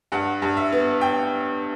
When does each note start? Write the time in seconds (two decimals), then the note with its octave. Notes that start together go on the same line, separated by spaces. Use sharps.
0.12 G2 F#5
0.42 G2
0.57 E5
0.72 B3
1.01 G5